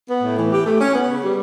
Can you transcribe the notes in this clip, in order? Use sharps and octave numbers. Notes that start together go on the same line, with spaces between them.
B3
A2
E3
G4
A3
C#4
B3
C#3
G3